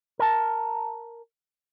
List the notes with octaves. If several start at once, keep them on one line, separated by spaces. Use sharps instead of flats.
A#4 A5